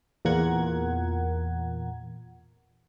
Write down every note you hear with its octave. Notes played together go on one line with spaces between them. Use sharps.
E2 A#2 F4 A#4 F#5 G#6